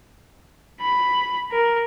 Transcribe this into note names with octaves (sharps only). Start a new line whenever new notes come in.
B5
A#4